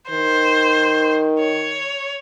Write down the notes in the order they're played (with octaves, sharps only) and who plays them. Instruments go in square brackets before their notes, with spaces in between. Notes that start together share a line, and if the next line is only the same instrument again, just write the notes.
[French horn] D#3 [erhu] C5
[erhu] C#5